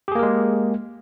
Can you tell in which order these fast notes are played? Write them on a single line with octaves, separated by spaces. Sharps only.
G4 G#4 A#3 A#4 G#3